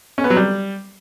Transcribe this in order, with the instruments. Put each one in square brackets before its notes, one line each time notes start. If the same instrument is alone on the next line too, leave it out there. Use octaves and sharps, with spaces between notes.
[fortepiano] C#4
B3
F#3
G3